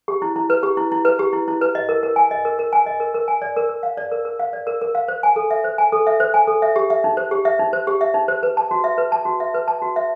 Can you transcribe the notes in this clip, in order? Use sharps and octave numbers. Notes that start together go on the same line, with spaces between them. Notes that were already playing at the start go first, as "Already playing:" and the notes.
G4
E4
E4
B4
G4
E4
E4
B4
G4
E4
E4
B4
D#5
A#4
A#4
G#5
D#5
A#4
A#4
G#5
D#5
A#4
A#4
G#5
D5
A#4
A#4
F5
D5
A#4
A#4
F5
D5
A#4
A#4
F5
C5
G#5
A4
E5
C5
G#5
A4
E5
C5
G#5
A4
E5
G4
E5
D#4
C5
G4
E5
D#4
C5
G4
E5
D#4
C5
B4
A5
F#4
E5
B4
A5
F#4
E5
B4
A5
F#4
E5